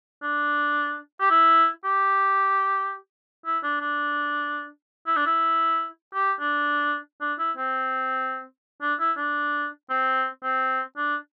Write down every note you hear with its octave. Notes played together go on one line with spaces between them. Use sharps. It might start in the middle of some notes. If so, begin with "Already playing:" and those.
D4
G4
E4
G4
E4
D4
D4
E4
D4
E4
G4
D4
D4
E4
C4
D4
E4
D4
C4
C4
D4